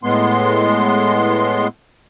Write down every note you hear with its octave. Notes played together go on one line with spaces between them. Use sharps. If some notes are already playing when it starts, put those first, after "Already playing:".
A2 G#3 B3 C6